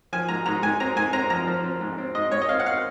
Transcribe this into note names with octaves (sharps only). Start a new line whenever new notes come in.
F3 G#5
G#2 A#5
G#2 A#5
G#2 G#5
C4 A#5
G#2 G#5
C4 A#5
F3 A#5
F3
C4
G#2
C4
G#2 D#5
G#2 C#5
D#5
C4 F5
F#5
F5